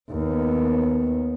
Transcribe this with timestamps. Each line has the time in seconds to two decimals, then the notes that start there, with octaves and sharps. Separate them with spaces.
0.11 D#2 B3